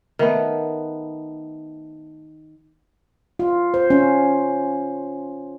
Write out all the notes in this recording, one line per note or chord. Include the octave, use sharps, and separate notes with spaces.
D#3 A3 B3
F4
C5
C#4